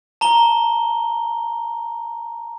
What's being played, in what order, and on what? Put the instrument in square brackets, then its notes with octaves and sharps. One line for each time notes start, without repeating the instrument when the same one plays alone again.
[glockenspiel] A5 A#5 G7